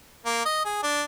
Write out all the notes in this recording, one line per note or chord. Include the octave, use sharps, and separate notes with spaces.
A#3
D#5
G#4
D4